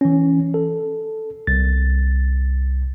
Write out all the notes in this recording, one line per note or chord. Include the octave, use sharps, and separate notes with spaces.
E3 C#4
A4
C2 A6